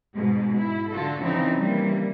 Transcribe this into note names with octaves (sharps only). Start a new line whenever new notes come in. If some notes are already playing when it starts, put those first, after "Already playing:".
G#2 B2 G#3
E4
D3 F4 F#4 A4
C#3 E3 F3 C4 D#4
E3 G3 A#3